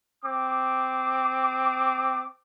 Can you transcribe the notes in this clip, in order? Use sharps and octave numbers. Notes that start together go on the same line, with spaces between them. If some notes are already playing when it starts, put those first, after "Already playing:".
C4 D6